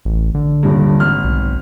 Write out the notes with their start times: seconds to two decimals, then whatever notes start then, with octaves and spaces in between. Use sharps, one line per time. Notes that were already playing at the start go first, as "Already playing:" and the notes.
0.05 A1
0.35 D3
0.63 D#1 G2
1.00 G#1 F6
1.24 B1